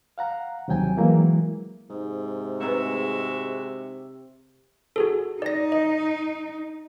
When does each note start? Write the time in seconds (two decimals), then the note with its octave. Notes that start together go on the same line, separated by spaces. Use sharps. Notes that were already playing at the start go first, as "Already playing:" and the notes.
0.18 F5 F#5 A#5
0.68 D#2 C3 F#3 G5 G#5
0.97 E3 F#3 G#3 A#3 E4
1.90 G#2 C3
2.61 G#3 A3 C4 F#4 B4 E5
4.96 F#4 G#4 A4
5.42 D#4 D5 A#6
5.72 D#5